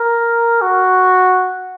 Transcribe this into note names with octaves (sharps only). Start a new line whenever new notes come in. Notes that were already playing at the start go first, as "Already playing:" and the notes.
Already playing: A#4
F#4